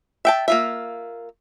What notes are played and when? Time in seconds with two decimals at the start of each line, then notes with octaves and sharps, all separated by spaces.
0.25 E5 G5 A5
0.48 A#3 F4 E5